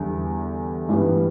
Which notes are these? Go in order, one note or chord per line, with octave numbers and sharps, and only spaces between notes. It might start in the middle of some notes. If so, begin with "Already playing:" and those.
Already playing: E2 D3 G3
G2 E3 G3 B3